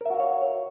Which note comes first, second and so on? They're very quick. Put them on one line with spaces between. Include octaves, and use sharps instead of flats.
A#4 E5 F#4 F5 C#5